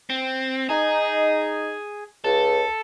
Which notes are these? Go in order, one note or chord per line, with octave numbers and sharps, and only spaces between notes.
C4
D#4 G#4
C#2 A4